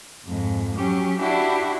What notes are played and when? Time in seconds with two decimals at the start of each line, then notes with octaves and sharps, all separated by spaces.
0.25 F2 G#2
0.76 F#3 C#4 G4
1.18 D4 E4 F#4 G4